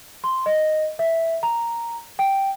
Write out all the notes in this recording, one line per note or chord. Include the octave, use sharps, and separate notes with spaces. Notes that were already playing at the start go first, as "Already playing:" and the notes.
C6
D#5
E5
A#5
G5